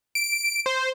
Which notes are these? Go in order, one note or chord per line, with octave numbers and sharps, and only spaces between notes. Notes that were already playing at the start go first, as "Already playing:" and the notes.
D7
C5